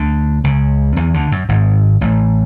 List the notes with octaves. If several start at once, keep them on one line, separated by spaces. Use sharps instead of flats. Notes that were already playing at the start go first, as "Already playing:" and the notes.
Already playing: D2 D3
C#2 C#3
E2 E3
D2 D3
F#2
G#1 G#2
A1 A2